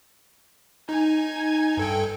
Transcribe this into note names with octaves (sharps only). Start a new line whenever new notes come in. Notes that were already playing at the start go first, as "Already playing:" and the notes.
D#4 G#5 G#6
G2 A4 G5